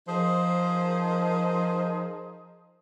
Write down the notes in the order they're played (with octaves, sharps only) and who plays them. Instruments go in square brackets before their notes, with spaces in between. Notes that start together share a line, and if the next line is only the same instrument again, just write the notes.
[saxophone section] F3 D#4 G#4 A#4 C5